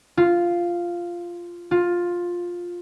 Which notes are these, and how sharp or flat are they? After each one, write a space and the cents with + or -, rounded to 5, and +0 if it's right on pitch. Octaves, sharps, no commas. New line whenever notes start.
F4 -5
F4 +10